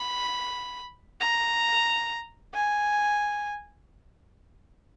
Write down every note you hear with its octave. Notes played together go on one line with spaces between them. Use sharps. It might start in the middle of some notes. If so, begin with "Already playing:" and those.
Already playing: B5
A#5
G#5